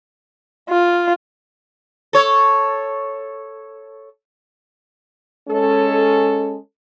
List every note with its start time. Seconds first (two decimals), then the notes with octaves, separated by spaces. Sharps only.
0.69 F4
2.13 A4 C#5
5.49 G#3 C#4 A4